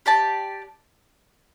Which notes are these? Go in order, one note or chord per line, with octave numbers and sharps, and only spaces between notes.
G4 D5 A5